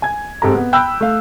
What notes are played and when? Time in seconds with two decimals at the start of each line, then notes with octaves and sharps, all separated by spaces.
0.02 G#5 G#6
0.42 G#2 C4 G4 A4 A#5
0.55 B3
0.73 G5 B5 E6 F#6 G6
1.01 A3 F5